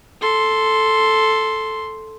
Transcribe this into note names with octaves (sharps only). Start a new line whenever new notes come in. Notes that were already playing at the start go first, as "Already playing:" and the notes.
A4 C6